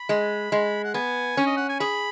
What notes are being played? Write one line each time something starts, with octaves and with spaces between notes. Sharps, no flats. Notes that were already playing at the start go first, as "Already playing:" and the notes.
Already playing: B5
G#3
G#3
F#5
B3 G#5
C#4
D#5
F#5
G#5
G#4 B5